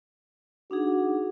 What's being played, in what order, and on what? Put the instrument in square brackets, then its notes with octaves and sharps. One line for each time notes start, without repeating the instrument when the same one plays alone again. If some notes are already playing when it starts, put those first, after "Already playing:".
[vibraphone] D4 D#4 G#4 [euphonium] F#4